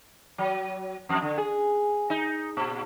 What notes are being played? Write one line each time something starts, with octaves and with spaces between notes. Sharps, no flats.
F#3
F2
D3
G#4
D#4
A#2